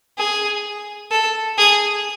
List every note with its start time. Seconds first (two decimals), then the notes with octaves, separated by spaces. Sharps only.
0.18 G#4
1.11 A4
1.58 G#4